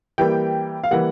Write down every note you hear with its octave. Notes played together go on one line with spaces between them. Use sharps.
E3 G3 A#3 G5
F5
E3 G3 A#3 F#5